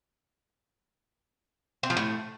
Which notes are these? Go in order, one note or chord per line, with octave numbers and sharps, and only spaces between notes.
C4
F3
A2